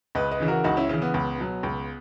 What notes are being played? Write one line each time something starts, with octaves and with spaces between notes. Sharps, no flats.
C#2 B4 D#5
B4 D#5
C#3 E3
F#4 A#4
C#2 D#4 F#4
C#4 E4
C#3 E3 C#4
B3
C#2
B2 F#3
C#2